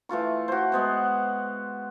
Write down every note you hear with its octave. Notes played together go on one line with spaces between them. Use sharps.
E3 A3 F4 C#6
F#4 C5
G#3 B3 C5